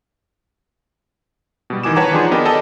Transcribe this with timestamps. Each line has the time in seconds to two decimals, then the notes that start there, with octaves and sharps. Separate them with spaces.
1.70 B2 G3
1.83 D#3 E3 G#5 D6 E7
1.96 B4 C#5 F#5 G5 A5 A#5
2.11 D#3 F3 D4 G#4 C6
2.31 B3 G4 A#4 D#5
2.45 G4 A4 D5 D#5 F#5 A5